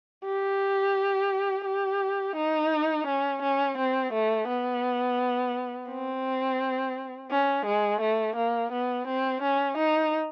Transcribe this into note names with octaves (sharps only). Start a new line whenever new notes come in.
G4
G4
D#4
C#4
C#4
C4
A3
B3
C4
C#4
G#3
A3
A#3
B3
C4
C#4
D#4